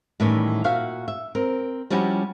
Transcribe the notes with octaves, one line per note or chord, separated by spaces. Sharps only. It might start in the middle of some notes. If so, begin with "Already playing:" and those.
A2 D#3 E3 G3 C#4
A#2 F#4 E5 F5
E5
C4 A#4
F3 G3 C#4 E4 F#4 G4